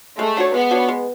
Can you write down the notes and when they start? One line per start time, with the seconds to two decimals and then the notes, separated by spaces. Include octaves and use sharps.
0.18 G#3 A3
0.37 D4 F#4 C#5
0.54 G#3 B3
0.71 D4 F#4 C#5
0.88 G#3